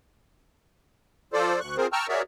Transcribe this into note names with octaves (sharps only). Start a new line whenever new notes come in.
F3 F4 A4 C5 D5
D2 C#6 F#6
C4 F4 G#4 A#4 C5
G5 A5 A#5 C#6 E6 F6
F#4 G#4 A#4 C#5 D5 E5